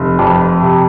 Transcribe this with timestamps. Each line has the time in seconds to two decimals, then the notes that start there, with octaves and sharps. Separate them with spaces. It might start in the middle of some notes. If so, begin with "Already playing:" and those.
Already playing: F1
0.19 F2
0.62 C3